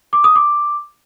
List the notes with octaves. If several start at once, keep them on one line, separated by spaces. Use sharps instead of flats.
D6
D#6
D6